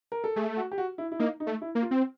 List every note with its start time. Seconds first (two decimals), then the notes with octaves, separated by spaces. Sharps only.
0.12 A#4
0.24 A4
0.36 A3 G#4
0.57 F#4
0.72 G4
0.78 F#4
0.98 E4
1.12 E4
1.19 A#3 D#4
1.40 D#4
1.47 A3
1.61 E4
1.75 A#3
1.82 F4
1.91 C4